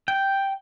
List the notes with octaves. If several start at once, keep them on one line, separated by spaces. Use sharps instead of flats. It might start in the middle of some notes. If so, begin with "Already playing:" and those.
G5